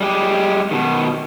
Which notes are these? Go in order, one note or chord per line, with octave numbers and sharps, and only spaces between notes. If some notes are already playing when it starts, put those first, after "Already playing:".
G3 G#3 G4
B2 D#3